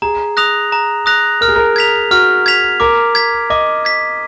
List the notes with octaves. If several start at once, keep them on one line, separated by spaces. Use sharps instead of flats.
G#4 A#5
D#6 F#6 A#6 F7
A#5
D#6 F#6 A#6 F7
A#4 F6
G#4
A#4
G#6 B6 F7
F#4 F6
G#6 B6 F7
A#4 D6
G#6 B6
D#5 D6
G#6 B6